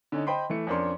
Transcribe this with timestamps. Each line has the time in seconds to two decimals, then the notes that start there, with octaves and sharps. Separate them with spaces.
0.12 D3 C#4 D#4
0.27 C5 D#5 G5 B5 C6
0.50 E3 A3 C#7
0.67 F2 C#4 D4 A#4 C6